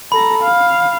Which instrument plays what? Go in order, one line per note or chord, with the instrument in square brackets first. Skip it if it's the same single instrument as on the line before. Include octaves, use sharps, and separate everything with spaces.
[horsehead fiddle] A4 A#5 [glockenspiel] B5
[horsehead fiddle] F5